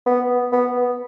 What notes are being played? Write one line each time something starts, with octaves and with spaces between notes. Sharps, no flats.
B3
B3